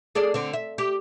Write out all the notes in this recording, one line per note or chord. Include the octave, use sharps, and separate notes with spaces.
G#4 A4 D5
D3 C4
E5
G4